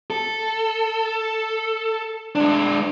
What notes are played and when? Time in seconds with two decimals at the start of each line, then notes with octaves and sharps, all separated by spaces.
0.10 A4
2.35 G#3 D4